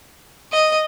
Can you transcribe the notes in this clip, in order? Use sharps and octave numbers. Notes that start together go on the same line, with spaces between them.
D#5